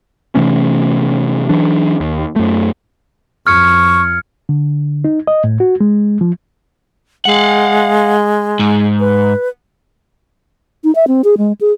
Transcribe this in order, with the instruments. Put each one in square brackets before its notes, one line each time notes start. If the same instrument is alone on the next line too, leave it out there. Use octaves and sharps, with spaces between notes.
[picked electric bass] C3 E3 A3 C#4
E3 F#3 D4
D#2
F#2 A3
[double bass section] F2 [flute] C#6 [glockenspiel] F6 G#6 C#7
[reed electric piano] D3
D#4
D#5
A2
F#4
G#3
F3
[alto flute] G#3 [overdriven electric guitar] F5 F#5
[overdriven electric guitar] G#2
[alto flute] B4
[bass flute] D#4
E5
C4
G#4
G#3
G#4